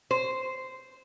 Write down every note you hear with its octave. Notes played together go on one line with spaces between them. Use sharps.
C5